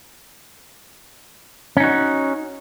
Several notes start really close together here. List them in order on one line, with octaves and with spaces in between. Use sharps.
C#4 D#4 F#4